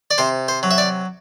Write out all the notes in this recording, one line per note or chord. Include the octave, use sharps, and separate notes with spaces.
D5
C3 C5
C5
F#3
E5
D5